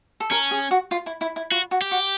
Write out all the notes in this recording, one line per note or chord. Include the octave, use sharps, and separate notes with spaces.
A4
C#4 A#4
G#4
F#4
F4
E4
E4
E4
F4 F#4
F#4
G4
F#4